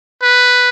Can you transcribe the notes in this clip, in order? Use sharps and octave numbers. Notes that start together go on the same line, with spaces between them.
B4